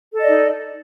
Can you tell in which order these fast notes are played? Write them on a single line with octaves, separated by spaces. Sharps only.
A4 D#5 D5 D#4